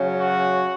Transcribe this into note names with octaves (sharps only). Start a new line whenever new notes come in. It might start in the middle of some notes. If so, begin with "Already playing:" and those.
Already playing: C#3 F#3 C#4
F#4